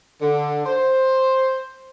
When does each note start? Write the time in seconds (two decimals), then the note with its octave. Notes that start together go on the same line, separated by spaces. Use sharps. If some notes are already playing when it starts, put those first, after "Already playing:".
0.21 D3
0.65 C5